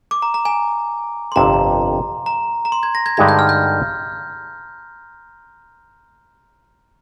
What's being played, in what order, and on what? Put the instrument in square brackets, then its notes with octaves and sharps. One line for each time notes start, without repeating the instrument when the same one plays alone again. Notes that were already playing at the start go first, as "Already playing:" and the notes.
[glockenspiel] D6
A#5
A#5
G#5
C6
[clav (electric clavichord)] G1 F2 C3 [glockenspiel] A#5
[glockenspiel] A#5
A#5
C6
G#6
A#6
G#6
[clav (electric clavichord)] G2 D3 G#3 D#4 G4 [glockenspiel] G#6
[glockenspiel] G6
F6
G6